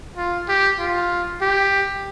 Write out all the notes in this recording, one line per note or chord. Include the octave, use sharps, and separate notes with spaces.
F4
G4
F4
G4